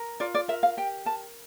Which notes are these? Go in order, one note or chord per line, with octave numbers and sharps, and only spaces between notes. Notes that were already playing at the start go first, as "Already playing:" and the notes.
Already playing: A#4
F4 D5
D5
A#4 E5
F5
G4 G5
A#4 A5